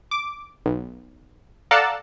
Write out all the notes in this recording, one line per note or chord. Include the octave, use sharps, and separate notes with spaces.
D6
B1
A4 D5 F5 F#5 A5 A#5